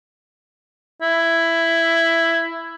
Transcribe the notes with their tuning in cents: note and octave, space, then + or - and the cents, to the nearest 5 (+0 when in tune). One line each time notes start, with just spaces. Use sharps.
E4 +10